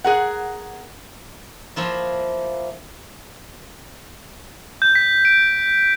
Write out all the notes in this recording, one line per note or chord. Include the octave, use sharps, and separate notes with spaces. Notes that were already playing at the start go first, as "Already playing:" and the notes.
G#4 A#4 F#5
F3 A#3 E4 F4
G6
B6
D7